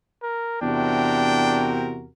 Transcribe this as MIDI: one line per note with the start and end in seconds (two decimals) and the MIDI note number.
0.22 0.57 70
0.62 2.06 40
0.62 2.08 48
0.62 1.72 62
0.62 2.08 66
0.62 2.08 70
0.62 1.89 79